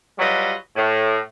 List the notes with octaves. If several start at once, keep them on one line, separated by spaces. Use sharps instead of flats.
F#3 G3 F4 F#4 B4 D#5
A2